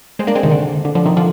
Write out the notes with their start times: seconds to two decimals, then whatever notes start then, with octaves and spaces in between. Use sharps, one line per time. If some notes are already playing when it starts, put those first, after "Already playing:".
0.19 G#3 C4
0.27 A#3 D4
0.35 G#3 C4
0.43 C3 D#3
0.51 D3
0.85 D3
0.95 D3 F3
1.05 C3 D#3
1.17 D3 F3